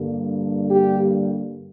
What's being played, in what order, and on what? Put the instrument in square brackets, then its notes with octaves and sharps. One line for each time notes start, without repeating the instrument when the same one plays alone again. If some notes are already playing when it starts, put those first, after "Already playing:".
Already playing: [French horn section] G2 D3 G3 A#3
G4